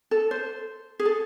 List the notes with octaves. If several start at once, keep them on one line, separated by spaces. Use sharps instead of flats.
A4
C5
G#4
A4